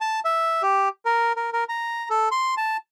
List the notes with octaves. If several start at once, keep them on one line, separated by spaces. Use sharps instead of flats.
A5
E5
G4
A#4
A#4
A#4
A#5
A4
C6
A5